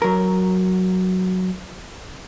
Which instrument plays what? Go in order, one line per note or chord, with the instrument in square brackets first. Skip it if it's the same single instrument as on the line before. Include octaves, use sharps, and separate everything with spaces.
[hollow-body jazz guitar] F#3 A#4